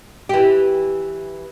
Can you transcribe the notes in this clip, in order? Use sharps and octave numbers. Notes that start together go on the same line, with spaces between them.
E3 G4